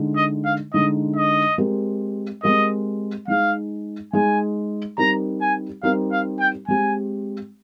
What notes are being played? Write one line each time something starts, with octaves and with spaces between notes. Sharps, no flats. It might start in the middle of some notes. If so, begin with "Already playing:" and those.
Already playing: D3 G#3 D#4
D#5
F5
D3 G#3 D#4 D#5
D#5
G#3 C4 G4 A#4
G#3 C4 G4 A#4 D#5
G#3 D#4 G#4 F5
G#3 D#4 G#4 G#5
G3 C4 D#4 G4 A#4 A#5
G#5
G3 C4 D#4 G4 A#4 F5
F5
G5
G#3 C4 G4 G#5